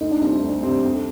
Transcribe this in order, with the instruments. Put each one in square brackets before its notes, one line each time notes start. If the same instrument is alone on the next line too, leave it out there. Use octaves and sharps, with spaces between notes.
[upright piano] D2 [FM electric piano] D#4
[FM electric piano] D4
[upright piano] C3 G3 C4 [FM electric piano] D4
[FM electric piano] D4
[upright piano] D2
C3 G3 C4
F2